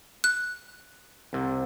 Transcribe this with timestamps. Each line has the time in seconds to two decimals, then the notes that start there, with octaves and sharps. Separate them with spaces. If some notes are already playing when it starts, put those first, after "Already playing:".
0.24 F#6
1.33 C2 C3